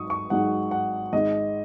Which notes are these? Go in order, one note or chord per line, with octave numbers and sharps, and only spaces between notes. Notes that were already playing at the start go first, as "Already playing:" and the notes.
Already playing: G#1 G#2 F#3 D#4 C#6 D#6
C#6
G#1 G#2 F#3 D#4 G#4 F#5
F#5
G#1 G#2 G#3 D#5